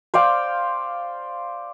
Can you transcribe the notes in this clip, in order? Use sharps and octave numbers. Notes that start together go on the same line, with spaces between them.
C5 D5 F5 G5